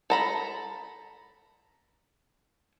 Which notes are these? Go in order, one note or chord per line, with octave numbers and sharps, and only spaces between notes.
A4 A#5 B5